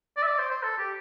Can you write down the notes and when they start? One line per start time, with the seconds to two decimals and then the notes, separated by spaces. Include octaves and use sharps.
0.17 D5
0.23 E5
0.28 D5
0.39 C5
0.50 C5
0.63 A4
0.78 G4